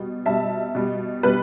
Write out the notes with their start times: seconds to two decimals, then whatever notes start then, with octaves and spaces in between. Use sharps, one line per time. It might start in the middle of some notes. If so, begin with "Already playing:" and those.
Already playing: B2 G3
0.26 B2 G3 E5 A5
0.75 B2 G3
1.23 B2 G3 B4